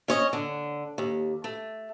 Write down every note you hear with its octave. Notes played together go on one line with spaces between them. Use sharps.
C#4 C#5 D#5
D3
D#2
A3